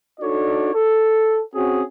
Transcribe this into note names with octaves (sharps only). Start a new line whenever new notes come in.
D4 D#4 F#4 A4 C#5 D5
A4
C4 C#4 F#4 G#4